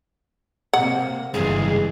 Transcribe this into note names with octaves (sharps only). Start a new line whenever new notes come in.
C3 A#3 F#5
G1 C#2 G2 E3 G#4